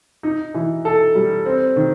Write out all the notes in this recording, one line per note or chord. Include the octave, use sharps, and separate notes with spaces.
D#4
E3
A4
G3
C4
D#3